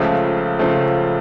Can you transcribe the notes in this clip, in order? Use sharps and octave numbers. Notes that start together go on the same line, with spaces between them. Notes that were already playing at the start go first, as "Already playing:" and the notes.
Already playing: C#2 C#3 F3 A3
C#3 F3 A3